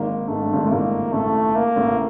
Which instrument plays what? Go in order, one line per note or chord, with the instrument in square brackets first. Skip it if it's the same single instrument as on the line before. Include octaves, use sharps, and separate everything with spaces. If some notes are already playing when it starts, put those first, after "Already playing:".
Already playing: [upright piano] G#1 G#2 [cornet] A#3
[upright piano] G#2 [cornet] A3
[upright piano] G2
G#1 G#2
A2
[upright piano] G#1 G#2 [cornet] A#3
[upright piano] A1 A2 [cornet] A3
[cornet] A#3
[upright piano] A1 A2